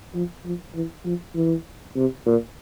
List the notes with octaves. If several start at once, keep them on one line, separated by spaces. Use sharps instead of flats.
F3
F3
E3
F3
E3
C3
A#2